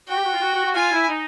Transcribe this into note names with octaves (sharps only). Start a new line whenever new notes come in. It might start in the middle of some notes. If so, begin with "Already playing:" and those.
F#4 G5
G4
F#4
F4
F#4
F#4
F#4
F4 G#5
E4
D#4